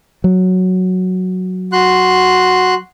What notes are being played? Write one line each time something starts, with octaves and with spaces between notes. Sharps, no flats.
F#3
F#4 C6 F#6